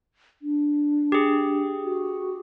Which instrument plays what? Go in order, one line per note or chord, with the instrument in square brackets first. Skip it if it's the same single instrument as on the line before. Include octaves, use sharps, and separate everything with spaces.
[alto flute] D4
[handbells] G4 G#4
[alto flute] F#4